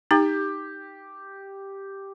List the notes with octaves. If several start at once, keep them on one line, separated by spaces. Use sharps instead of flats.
D#4 G4